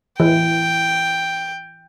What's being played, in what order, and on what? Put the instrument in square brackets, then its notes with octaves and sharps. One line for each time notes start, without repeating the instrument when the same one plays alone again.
[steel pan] E3 [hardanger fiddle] G5